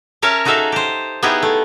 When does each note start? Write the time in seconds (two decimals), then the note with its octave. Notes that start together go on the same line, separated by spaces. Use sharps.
0.22 C#4 A#4 C#5 E5 A5
0.45 D#4 F#4 G#4 A4 E5 F5
0.72 G4 C5
1.23 B3 D#4 E4 G4 G#4
1.43 A3